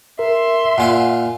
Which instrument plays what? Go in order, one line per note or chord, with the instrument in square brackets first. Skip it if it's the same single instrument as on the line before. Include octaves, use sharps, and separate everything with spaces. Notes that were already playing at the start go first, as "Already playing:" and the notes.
[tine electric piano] A#4 [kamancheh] E5 C6
[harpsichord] A#2 F4 F5 [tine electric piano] F#5 G#5